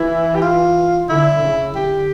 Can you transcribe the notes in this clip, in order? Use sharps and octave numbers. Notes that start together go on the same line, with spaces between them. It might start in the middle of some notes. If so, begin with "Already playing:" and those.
Already playing: E3 E4
G4
F4
D3 E4
C#3
D3 G4